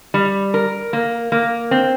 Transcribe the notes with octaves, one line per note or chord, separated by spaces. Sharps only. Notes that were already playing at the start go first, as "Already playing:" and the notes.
G3
A#4
A#3
A#3
C4